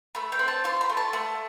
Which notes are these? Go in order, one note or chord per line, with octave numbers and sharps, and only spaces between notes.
A3 B5
G5
C4
A5
F4 C6
B5
A3
A5
A3